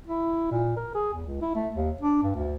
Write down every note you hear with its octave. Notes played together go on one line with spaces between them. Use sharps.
E4
A#2
A#4
G#4
E2
C#2
E4
A3
D#2
D4
G2
D2